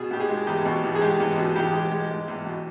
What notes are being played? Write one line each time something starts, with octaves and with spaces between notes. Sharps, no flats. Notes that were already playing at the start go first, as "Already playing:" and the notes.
Already playing: B2 G#4
B2 G4
G#4
G#3
E2 G4
B2
E2
G#4
G#3 G4
E2
B2
E2 G4
G#3
G#3
G#3
E2
B2